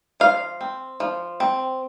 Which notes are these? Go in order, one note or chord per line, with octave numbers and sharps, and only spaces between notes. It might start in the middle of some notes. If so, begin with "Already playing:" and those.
F3 F5
C4
F3
C4